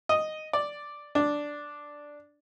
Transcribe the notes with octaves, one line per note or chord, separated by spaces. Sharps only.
D#5
D5
D4